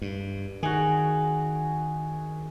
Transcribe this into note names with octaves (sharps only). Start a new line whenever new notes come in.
G2
D#3 F#4 G#4